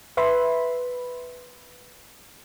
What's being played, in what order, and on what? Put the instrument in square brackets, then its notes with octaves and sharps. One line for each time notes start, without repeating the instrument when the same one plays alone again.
[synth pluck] B4 E5 B5 C6